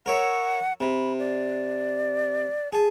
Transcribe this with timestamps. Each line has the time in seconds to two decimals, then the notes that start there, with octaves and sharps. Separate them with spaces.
0.06 A#4 C#5 E5 F#5
0.80 C3 B5
1.19 D5
2.73 G#4 A5